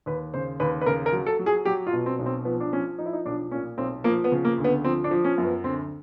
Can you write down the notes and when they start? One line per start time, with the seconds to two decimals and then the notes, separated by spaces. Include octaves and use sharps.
0.06 D#2 B4
0.34 C#3 C5
0.60 D#2 B4
0.81 B4
0.86 C#3 A#4
1.06 A#4
1.13 F#3
1.26 A4
1.39 F#3
1.46 G#4
1.65 F#3 G4
1.87 F4
1.93 B2
2.06 C4
2.19 B1
2.26 C4
2.45 F3 B3
2.60 D4
2.72 F3 C#4
2.98 F3 D#4
3.06 E4
3.13 D#4
3.26 B1 D4
3.51 A#2 C#4
3.78 B1 C4
4.04 F3 A#3
4.24 B3
4.32 C#3
4.45 A#3
4.58 D2
4.64 B3
4.84 F3 C4
5.04 D4
5.11 F3
5.24 C#4
5.38 F#2
5.45 B3
5.64 D2 C4